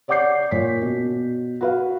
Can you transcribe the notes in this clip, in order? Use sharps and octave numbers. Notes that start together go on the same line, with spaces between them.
C#5 D5 F#5 D6 G6 C7
A#2 C#5 B6
B2
F#4 B4 F5